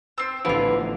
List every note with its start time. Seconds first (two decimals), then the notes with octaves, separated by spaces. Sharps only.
0.18 C4 E6 A6
0.45 A1 D3 E3 F3 B3 E4 F4